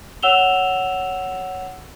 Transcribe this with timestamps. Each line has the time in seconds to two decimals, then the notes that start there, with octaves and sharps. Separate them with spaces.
0.23 C#5 F#5 E6 E7 F7 G7